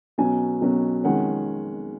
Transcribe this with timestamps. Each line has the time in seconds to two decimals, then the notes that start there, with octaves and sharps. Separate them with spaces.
0.18 B1 B2 F#3 C#4 G#5
0.61 B1 B2 F#3 C#4
1.04 F2 D#3 G#3 C#4 F#5